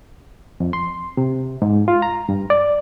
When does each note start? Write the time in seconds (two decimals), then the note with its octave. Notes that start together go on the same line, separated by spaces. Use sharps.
0.60 F2
0.73 C6
1.17 C3
1.62 G#2
1.88 F4
2.02 A#5
2.29 G2
2.50 D5